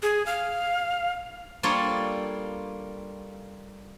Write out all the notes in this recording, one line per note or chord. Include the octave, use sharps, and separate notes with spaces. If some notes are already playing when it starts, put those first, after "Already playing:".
G#4
F5
G3 A#3 D4 F4 A4 C#5